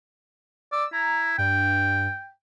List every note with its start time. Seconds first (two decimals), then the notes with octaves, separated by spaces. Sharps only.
0.72 D5 E6
0.93 E4 A#5
1.38 G2 G5